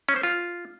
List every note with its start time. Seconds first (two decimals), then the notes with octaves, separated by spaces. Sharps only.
0.09 C#4
0.16 C5
0.23 F4